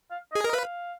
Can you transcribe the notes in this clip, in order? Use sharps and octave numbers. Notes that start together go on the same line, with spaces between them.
F5
D#5
G#4
A#4 D#5
B4 F5